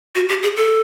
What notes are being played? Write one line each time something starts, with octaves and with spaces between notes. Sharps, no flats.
F#4
G4
G#4
A4